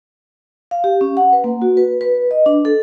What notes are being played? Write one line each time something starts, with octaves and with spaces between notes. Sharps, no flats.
F5
G4
C#4
F#5
B4
A#3
F#4
B4
B4
D#5
D4
A4